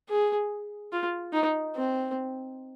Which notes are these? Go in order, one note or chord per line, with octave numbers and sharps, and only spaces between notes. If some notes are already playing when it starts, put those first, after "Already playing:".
G#4
F4
D#4
C4